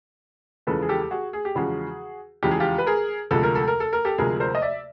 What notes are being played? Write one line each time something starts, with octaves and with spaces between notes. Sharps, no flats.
E2 C#3 F3 G#3 A4 B4
G#4
G4 A4
G4
F#4 G#4
G#4
G4
E2 C#3 F3 G#3 F#4 G#4
E2 C#3 F3 G#3 G4
G#4
F4 G4
B4
G#4 A#4
D2 C3 F3 G#3 A4
A#4
A4
A#4
A4
A#4
G4 A4
D2 C3 F3 G#3 G#4 A#4
A#4 C5
D#5
D5 E5